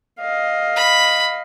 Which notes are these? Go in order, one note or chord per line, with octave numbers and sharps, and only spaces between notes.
D#5 F5
B5